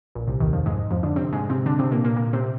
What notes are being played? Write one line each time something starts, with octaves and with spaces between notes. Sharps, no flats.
A#1 A#2
C2 C3
D#2 D#3
F2 F3
G#2 G#3
F2 F3
D3 D4
C3 C4
G#2 G#3
C3 C4
D3 D4
C3 C4
A#2 A#3
A#2 A#3
A#2 A#3
C3 C4